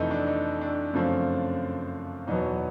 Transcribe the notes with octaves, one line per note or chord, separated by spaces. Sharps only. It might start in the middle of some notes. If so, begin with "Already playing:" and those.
Already playing: F2 C3 E3 A3 D#4 E4
D4
D#4
D4
F#2 C#3 F3 A3 C4
E2 B2 F#3 B3 D#4